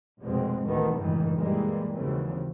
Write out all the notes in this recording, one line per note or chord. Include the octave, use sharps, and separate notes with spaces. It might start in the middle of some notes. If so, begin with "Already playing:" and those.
F1 F2 B2 G#3 C4
A1 D2 A2 D#3 A3 B3
G1 C#2 F#2 A2 D#3 E3
A#2 E3 G3 G#3 A#3
D#2 C#3 E3 F#3 C4